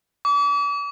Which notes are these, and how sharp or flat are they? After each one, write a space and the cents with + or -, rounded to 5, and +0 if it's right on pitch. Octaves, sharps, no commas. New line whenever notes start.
D6 -40